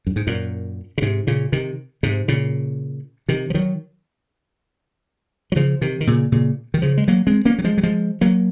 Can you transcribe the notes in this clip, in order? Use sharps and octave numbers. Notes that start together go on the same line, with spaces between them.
F#2
G#2
F#2 A#2
C#3
G#2 C3
A#2 C#3
C3 D#3
G#2 C3
A#2 C#3
C3 D#3
F3
D#3 F#3
F#3
C#3 F3
C3 D#3
D#3
A#2 C#3
A#2 C#3
D#3
C#3 F3
G#3
F#3 A#3
G#3 C4
A#3 C#4
F#3
F3 G#3
F#3
F3 G#3
F#3 A#3